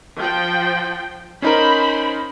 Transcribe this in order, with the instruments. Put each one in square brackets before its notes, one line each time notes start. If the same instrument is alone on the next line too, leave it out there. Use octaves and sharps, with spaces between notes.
[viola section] F3 G5
[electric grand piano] C#4 D#4 A#4 [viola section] C5 B5